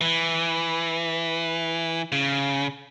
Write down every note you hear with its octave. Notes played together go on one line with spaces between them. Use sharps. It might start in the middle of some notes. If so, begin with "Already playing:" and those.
E3
C#3